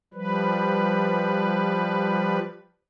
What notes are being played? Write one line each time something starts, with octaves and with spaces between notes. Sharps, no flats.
F3 G3 B4